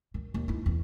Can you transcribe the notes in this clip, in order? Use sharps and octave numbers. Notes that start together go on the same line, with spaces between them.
D#3
D#2
D#4 E4
E2